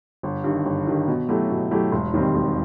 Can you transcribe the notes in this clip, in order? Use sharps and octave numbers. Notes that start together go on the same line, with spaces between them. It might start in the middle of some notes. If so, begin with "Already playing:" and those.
G1
G2 D#3
G1
G2 D#3
B2
F#3 A3 E4 G4
B2
F#3 A3 E4 G4
E1
D#2 D#3 G3 C4
E1